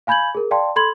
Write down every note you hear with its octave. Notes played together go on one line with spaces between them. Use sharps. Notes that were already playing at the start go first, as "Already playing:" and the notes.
F5 G#5 B5 G6 G#6 F#7
G#4 A#4
D5 F5 G5 A5 C6
A4 B5 C6 G#6 F#7